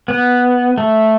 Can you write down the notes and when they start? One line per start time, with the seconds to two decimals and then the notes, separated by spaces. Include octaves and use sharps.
0.08 B3
0.78 A3